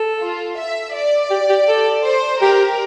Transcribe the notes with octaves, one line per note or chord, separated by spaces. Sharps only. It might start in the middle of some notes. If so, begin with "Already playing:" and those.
Already playing: A4
F4
E5
D5
G4
G4
A4
C5
G4 A#4